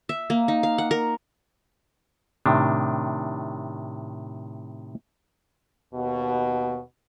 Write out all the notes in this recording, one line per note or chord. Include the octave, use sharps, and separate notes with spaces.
E5
A#3
D#4
F5
F#5
A#4
A2 C3 D#3 D4
D#2 B2